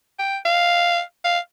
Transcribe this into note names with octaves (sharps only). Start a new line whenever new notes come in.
G5
F5
F5